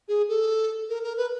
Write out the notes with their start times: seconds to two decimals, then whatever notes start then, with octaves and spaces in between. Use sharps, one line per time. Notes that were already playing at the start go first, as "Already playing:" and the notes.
0.08 G#4
0.29 A4
0.89 A#4
1.04 A#4
1.17 B4